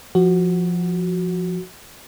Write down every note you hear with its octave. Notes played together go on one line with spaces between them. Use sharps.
F3 F#4